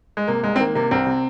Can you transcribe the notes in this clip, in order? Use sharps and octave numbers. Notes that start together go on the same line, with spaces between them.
G#3
C3 A#3
C2 G#3
C4
D#3 A#3
C3 A#3
C2 C4
C3